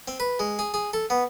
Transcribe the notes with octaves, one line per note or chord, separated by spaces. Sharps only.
C4
B4
G#3
G#4
G#4
A4
B3